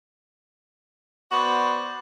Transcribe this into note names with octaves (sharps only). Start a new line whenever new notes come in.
B3 F#4 C5 D5